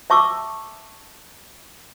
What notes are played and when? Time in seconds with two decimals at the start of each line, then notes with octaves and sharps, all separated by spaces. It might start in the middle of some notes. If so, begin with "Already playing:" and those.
0.10 E5 A5 C#6 D6 E6